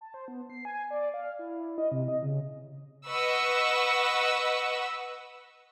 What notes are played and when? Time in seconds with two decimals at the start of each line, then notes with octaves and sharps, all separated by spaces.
0.01 A5
0.14 C5
0.28 B3
0.50 C7
0.65 G#5
0.91 D5
1.14 F5
1.39 E4
1.78 D#5
1.92 C3
2.08 D#5
2.23 C#3
3.08 B4 D#5 F#5 C#6 E6